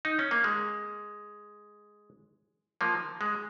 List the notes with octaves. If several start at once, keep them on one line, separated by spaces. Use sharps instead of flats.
D#4
C#4
A#3
G#3
F3 A#3
G#3